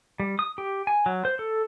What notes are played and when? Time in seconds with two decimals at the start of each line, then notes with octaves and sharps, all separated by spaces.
0.20 G3
0.39 D#6
0.58 G4
0.87 G#5
1.06 F#3
1.25 C5
1.39 A4